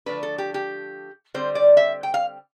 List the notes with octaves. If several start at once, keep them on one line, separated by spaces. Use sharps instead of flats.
D3 F3 A3 D4 B4
A4
G4
G4
D3 G3 C4 C5
D5
E5
G5
F5